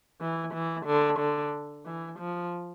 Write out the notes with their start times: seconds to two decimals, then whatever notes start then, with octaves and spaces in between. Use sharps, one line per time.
0.21 E3
0.53 E3
0.86 D3
1.19 D3
1.85 E3
2.19 F3